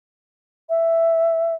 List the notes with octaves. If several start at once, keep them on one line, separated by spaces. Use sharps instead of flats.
E5